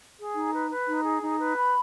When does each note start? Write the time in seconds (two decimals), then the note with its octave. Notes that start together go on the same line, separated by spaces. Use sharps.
0.17 G#4
0.35 D#4
0.53 B4
0.70 B4
0.87 D#4
1.04 G#4
1.22 D#4
1.39 B4
1.56 B5